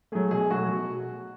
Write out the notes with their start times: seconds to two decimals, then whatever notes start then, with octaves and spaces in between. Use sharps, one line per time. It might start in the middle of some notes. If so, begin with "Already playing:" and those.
0.12 F#3 A3 G#4
0.31 B2 G#4
0.50 F#3 A3 F#4
0.69 B2